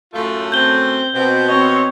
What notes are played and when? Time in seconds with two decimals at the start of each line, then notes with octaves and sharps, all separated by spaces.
0.14 F#2 A2 A3 F4
0.52 C4 G6 G7
1.14 B2 C4
1.48 C4 C#5 D#5